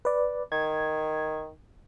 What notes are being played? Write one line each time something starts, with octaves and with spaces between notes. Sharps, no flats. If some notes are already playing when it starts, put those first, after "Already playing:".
B4 D5
D#3 G#6